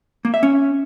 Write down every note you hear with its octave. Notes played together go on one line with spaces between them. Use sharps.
A#3
E5
C#4